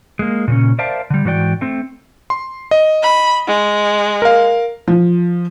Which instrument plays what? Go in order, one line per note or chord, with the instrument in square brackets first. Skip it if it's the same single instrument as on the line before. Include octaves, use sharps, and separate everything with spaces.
[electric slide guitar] G#3 A#3
A#2 C#3 C#4
A#4 C5 D5 E5 F5 A5
D3 G3
G#2 E3 F#4 D5 G5
A3 C4
[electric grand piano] C6
D#5
[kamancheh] B5
G#3
[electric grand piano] A#4 F5
[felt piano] F3